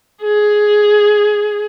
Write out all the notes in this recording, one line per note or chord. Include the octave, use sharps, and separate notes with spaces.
G#4